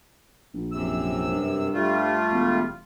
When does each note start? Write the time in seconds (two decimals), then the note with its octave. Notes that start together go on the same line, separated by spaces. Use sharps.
0.54 A#1
0.72 F#2 C3 E6
1.31 G2
1.74 G3 A3 F4
2.31 E1